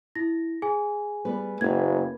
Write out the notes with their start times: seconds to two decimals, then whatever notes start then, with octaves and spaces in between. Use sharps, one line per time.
0.15 E4 A#6
0.62 G#4 G#5
1.25 G3 B3 B4
1.61 F#1 A#3 B4 G#6